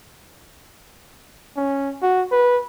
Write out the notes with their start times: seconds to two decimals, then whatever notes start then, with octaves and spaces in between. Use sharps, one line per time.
1.57 C#4
2.02 F#4
2.32 B4